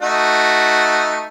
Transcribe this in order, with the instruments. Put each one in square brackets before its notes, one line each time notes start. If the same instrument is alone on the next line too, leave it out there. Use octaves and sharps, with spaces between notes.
[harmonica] A3 D#4 F#4